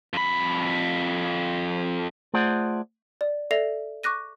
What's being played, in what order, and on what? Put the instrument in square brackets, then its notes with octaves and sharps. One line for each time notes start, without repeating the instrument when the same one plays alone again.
[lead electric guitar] F2 B5
[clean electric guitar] A3 F4 G#4 C5 D5 F#5
[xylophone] D5
A4 D5 E5 A#6 C7 F7
C#6 D6 F#6 A#6 D#7